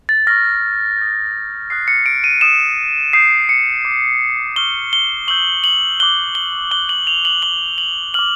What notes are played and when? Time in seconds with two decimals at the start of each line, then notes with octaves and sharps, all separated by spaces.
0.09 A6
0.27 C#6 F6 A#6
0.98 D#6 G6
1.70 D#6 F#6 C7
1.88 C#7
2.06 D7
2.24 D#7
2.41 D#6 F#6 E7
3.13 D#6 G6 C7
3.49 C#7
3.85 D6 G6
4.56 C#6 F6 G7
4.93 G7
5.27 C#6 E6 G6 F#7
5.64 F#7
6.00 D6 F#6 G7
6.35 G7
6.71 D6 F#6 G7
6.89 F#7
7.07 F7
7.25 F#7
7.42 D6 F#6 G7
7.78 F#7
8.14 D6 F6 F#7